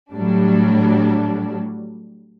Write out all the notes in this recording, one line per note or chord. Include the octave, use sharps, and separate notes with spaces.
A2 F#3 G3 D4